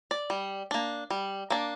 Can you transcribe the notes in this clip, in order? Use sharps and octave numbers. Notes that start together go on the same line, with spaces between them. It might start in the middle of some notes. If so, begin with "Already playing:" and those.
D5
G3
A#3 D4
G3
A#3 D4